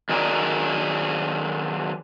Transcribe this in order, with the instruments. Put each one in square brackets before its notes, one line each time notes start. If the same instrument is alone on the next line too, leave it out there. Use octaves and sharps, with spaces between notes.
[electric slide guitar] D#3 F#3 G#4 A#4 D5